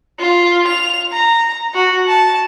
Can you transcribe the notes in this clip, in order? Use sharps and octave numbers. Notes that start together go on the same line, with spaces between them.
F4
F7
A#5
F#4
A5